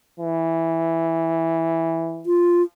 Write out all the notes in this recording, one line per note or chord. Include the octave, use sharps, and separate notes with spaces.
E3
F4